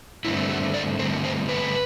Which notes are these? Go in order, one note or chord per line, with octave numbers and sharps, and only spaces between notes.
G2 D3 A3 C4 E4
F#4
D5
G2 D3 A3 C4 C5
C5
B4